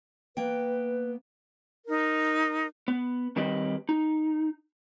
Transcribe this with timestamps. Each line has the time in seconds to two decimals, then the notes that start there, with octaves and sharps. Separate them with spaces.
0.37 A#3 B3 B4 G5
1.88 D#4 A#4
2.88 B3
3.36 D#3 G3 C4 G4 B4 D#5
3.89 D#4